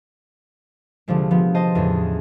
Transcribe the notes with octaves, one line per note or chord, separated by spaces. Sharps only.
C2 D3 F3 G#3
F3 G#3 B3
C5 D#5 A5
E2 A2 C#3